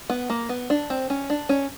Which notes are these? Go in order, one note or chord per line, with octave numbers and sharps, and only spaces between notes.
B3
A#3
B3
D4
C4
C#4
D4
C#4